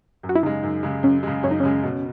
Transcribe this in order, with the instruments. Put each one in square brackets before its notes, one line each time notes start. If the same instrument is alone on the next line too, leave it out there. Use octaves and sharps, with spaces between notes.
[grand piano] F#2
[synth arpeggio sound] F#4
E4
[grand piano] C#3 G#3 [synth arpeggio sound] D#4
[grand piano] F#2
C#3 G#3
[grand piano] F#2 [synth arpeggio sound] C#4
[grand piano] C#3 G#3
[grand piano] F#2 [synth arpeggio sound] C#4
[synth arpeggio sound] D#4
[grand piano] C#3 G#3 [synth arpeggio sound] C#4
[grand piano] B2